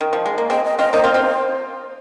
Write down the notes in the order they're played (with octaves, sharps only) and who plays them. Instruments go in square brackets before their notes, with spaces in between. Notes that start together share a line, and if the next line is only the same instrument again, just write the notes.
[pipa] D#3
F3
G#3
A#3
[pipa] G#3 C4 [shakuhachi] D#5
[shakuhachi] D#5
[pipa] C4 F4 [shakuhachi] D#5
[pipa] A#3 D#4 [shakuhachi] C5
[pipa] C4 F4
C4 F4